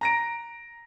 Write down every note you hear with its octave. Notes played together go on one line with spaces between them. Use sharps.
A#5 A#6 D7